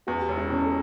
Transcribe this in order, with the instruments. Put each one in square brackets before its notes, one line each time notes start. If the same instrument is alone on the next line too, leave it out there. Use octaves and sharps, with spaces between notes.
[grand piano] E2 [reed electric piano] F#4
[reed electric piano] G4
[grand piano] E1
[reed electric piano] E4
[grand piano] B2 [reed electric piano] C#4
[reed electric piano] A4